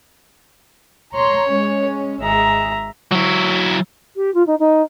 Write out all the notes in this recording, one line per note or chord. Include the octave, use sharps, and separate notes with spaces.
C#5 A#5 C6
G#3 C#4
G#1 G#3 E5 A#5
F#3 E4
G4
F4
D#4
D#4